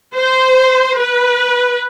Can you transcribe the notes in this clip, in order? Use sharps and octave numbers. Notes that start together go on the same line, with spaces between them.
C5
B4